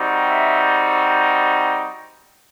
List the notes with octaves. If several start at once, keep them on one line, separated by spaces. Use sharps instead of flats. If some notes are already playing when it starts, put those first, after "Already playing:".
Already playing: G3 C4 D#4 F#4
E5